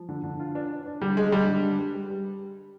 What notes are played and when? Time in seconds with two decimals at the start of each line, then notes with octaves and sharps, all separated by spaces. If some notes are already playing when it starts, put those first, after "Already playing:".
Already playing: F3
0.09 D3
0.23 D3
0.40 F4
0.55 D4
0.70 D4
0.86 D4
1.01 D3 G3
1.17 G#3 D4
1.32 D3 G3
1.48 D3
1.64 G3
1.79 G3
1.94 G3
2.10 G3